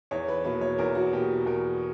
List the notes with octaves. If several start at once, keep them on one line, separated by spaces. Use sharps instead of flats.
E2 C#5
B4
B2 A#3 B4
C#5
E2 A#4
F#4
B2 A#3 G4
E2 A#4